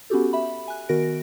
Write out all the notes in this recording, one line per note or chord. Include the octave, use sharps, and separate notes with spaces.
B3 C#4 F#4 G4 A4
E5 B5
G#5 F#6
D#3 B3 F#4 A#4 A#6 D7